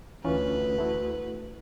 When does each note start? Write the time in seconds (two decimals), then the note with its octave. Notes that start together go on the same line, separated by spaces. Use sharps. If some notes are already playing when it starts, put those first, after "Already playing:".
0.25 D2 E3 C#4 F4 B4
0.78 A3 E4 F#4